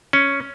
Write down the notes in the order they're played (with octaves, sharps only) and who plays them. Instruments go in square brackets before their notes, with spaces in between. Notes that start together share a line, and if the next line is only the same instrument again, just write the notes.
[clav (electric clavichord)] C#4